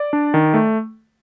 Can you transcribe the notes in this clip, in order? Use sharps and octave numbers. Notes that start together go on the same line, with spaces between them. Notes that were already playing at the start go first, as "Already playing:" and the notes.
Already playing: D5
D4
D#3
A3